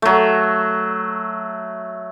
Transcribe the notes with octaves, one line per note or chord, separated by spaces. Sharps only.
F#3 A3